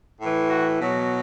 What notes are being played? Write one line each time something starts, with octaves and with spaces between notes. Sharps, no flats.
A2 E3
F#4
B2 F#3